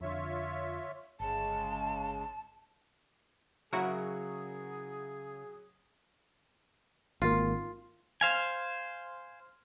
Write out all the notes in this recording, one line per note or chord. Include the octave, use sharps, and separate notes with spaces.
F2 D3 F4 C#5 E5
G1 C#3 G#3 A5
C#3 F#3 E4 F#4 G#4 A#4
G#1 A#3 F4
C5 F5 G#5